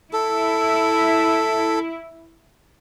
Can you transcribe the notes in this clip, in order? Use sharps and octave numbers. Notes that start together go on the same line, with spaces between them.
E4 A4